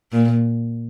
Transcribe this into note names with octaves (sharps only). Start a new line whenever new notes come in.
A#2